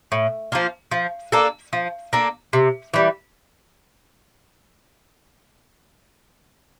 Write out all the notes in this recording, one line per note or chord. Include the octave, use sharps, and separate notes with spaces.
A2
F3 A#3 F4
F3
A#3 D4 A4
F3
A#3 D4 A4
C3
E3 G3